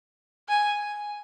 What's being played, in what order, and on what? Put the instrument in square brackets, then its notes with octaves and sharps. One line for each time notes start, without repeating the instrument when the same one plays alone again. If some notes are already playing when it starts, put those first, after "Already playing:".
[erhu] G#5